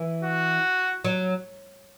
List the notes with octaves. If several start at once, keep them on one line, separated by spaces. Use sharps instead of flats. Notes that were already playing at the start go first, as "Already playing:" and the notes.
Already playing: E3
F#4
F#3